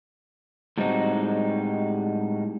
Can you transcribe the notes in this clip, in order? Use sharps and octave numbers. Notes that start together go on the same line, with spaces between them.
A2 G3 G#3 C4 D#4 F#4